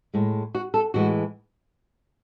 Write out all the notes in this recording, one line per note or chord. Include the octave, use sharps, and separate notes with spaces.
A2 G#3
F#4
A4
A2 E3 G#3 F#4